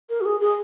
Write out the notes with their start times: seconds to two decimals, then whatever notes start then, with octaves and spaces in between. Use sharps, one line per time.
0.10 A#4
0.21 F#4
0.26 G#4
0.41 G#4